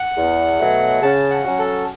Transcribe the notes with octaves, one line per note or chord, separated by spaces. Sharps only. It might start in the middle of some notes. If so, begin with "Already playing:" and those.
Already playing: F#5
E2
B2 F#3 A3
C#3 A5
F#5
F#3 C#4 F#4
A4